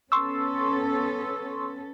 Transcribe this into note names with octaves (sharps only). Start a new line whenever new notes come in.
B3 C#4 A4 C6 C#6 E6